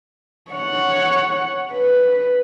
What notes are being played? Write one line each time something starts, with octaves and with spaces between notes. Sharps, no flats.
C#5 F#5
B4